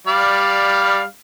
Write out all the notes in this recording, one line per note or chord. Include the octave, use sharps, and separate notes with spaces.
G3 D5 F5